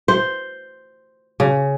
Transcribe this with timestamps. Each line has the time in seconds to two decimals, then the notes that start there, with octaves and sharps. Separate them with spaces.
0.08 C5
1.40 C#3